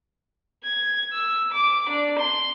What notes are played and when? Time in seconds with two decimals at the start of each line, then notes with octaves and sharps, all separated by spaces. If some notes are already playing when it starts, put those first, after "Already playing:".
0.64 G#6
1.13 E6
1.52 D6
1.89 D4
2.19 C6